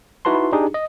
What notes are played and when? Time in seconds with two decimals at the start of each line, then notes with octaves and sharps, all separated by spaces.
0.25 D#4 E4 F#4 B4 A5 C6
0.52 D4 D#4 G4 G#4
0.74 D#5